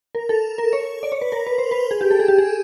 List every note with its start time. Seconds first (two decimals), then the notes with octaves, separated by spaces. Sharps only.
0.15 A#4
0.29 A4
0.58 A#4
0.73 C#5
1.03 D5
1.12 C#5
1.21 B4
1.32 A#4
1.47 B4
1.58 C5
1.71 B4
1.91 G#4
2.01 G4
2.11 A4
2.20 G#4
2.28 G4
2.38 G#4